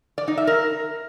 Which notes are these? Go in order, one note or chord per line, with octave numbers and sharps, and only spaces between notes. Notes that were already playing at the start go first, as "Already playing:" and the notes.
D5
D#4
E5
A#4